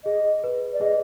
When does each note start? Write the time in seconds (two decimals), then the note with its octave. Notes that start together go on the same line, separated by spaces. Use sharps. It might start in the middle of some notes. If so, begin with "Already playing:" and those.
0.05 G#4 D#5
0.44 B4
0.73 D5
0.81 G#4 D#5